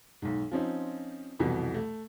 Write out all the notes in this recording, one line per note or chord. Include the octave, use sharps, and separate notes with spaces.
B1 G#2
F3 C4 C#4 D#4
C2 F2 B2 E3
A3